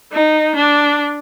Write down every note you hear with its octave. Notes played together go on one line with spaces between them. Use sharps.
D#4
D4